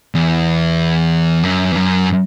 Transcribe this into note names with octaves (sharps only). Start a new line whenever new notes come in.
E2
F#2
E2
F#2